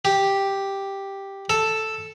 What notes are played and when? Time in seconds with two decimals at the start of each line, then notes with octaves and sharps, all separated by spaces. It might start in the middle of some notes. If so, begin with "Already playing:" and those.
0.05 G4
1.50 A4